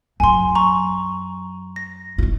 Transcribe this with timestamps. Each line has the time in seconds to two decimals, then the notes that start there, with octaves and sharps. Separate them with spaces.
0.20 F#2 F#3 G#5 C6
0.55 A#5 C#6
1.76 A#6
2.18 D#4 F4